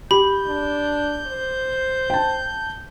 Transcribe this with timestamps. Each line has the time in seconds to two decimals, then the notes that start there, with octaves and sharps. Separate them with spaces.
0.11 G4 B5 G6
0.46 D4
1.27 C5
2.10 G5 A5